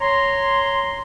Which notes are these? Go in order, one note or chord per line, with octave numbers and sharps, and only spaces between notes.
C#5 A#5 C6